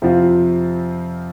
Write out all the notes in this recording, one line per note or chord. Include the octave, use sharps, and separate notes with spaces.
F2 C3 F3 C4 F4